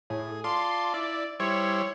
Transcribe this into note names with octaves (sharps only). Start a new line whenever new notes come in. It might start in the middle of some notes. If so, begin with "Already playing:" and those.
A2 G#4
F4 D5 A5 C6
E4 D5
G3 E4 C5 C#5